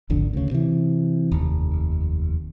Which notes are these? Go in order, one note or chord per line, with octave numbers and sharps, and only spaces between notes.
D1 G#1 F2 D3
D2 C#3
C3 E3
F1 D#2